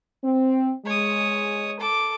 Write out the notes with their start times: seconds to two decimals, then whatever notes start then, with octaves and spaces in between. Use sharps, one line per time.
0.23 C4
0.86 G#3 C#5 D#6
1.80 A4 D6